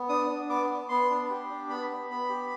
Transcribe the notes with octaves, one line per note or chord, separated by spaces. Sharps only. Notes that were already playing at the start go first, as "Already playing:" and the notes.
Already playing: B3
D4 D#6
D4
B3 D6
B3
B3 C6
D4
G4
D4
B3 B5
B3
B3 B5
G4